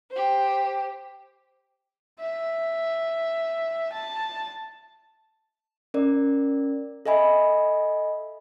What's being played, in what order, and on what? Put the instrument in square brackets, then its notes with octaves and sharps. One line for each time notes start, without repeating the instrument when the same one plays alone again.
[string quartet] G4 C5
[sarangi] E5
A5
[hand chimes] C#4 A#4 D5
A4 D#5 E5 G#5 B5